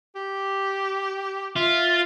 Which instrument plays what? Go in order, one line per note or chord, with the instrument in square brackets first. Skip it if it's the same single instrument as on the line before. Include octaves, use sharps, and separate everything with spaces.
[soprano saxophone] G4
[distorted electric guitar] F4 [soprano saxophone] E5